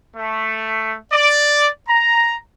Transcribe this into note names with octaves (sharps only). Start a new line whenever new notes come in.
A3
D5
A#5